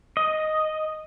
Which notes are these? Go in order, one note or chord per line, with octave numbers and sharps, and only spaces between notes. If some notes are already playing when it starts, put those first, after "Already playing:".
D#5